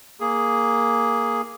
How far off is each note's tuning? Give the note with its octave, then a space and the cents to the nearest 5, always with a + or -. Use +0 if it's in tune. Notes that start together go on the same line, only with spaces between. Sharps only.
A#3 +0 G#4 +0